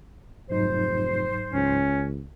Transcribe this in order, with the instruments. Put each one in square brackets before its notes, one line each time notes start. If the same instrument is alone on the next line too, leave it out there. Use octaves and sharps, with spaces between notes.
[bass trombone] F1 [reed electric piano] G#2 F#3 D#4 [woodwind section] C5
[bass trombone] C#2 [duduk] C#4